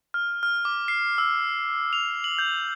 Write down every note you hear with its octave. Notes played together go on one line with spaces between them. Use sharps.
F6
F6
D6
C7
E6
F7
F#7
G6